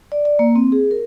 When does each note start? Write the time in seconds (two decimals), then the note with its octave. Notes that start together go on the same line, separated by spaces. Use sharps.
0.12 D5
0.25 D5
0.39 A#3
0.56 C4
0.72 G#4
0.91 A#4